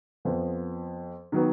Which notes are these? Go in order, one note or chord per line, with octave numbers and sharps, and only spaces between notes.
F2 F3 B3
D#3 F#3 B3